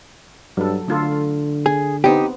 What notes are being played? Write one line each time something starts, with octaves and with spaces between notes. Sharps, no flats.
G2 F#3 A4
D3 A3 F4 A4
G#4
B3 C4 D#4 G4